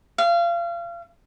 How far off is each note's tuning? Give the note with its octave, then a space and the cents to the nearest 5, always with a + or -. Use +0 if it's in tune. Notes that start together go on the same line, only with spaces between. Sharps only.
F5 -30